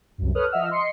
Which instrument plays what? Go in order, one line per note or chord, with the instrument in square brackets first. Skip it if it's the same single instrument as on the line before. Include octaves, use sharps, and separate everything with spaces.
[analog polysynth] C2 F#2
A4 B4 C#5 D#6 F6 F#6
F3 D#5 E5 F#5 E6 F6
D#5 C6 C7 C#7